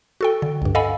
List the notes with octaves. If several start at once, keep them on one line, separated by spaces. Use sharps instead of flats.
F#4 A4 G5
D3
C#2 G2
A4 D#5 F5 F#5 G#5 B5